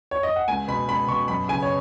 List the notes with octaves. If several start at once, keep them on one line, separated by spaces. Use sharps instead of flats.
C#5
D#5
F#5
C#2 G#5
B2 B5
C#2 B5
B2 C#6
F#2 B5
C#3 G#5
C#5